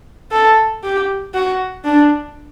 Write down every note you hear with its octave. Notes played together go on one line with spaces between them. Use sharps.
A4
G4
F#4
D4